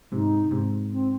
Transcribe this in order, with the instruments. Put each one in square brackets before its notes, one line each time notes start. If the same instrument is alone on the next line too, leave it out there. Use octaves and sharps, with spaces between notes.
[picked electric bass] G#2 C3 [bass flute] D#4
[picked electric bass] G#2 C3
[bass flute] C4